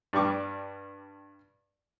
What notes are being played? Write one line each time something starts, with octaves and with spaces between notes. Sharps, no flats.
G2 G3 C#6 D6